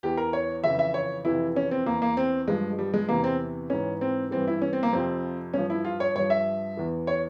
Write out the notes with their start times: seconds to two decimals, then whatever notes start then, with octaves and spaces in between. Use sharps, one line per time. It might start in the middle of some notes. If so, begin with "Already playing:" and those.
0.03 E2 E3 G4
0.17 A#4
0.33 C#5
0.64 F2 C#3 E3 E5
0.79 E5
0.94 C#5
1.25 F2 C3 E3 E4
1.56 C#4
1.71 C4
1.86 E2 E3 A#3
2.02 A#3
2.17 C4
2.47 G2 F3 G#3
2.79 G3
2.94 G#3
3.09 E2 C3 E3 A#3
3.24 C4
3.70 G#2 E3 C#4
4.01 C4
4.31 G2 E3 C4
4.47 E4
4.62 C#4
4.73 C4
4.83 A#3
4.93 F2 C3 F3 C4
5.54 G2 F3 C#4
5.70 E4
5.85 F4
6.00 C#5
6.16 G2 F3 C#5
6.30 E5
6.77 E2 E3
7.07 C#5